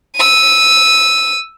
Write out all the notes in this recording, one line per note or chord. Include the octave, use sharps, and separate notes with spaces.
E6 D#7